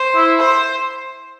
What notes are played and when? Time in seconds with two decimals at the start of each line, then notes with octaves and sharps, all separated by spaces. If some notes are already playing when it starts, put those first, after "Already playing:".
Already playing: C5
0.16 E4
0.39 C5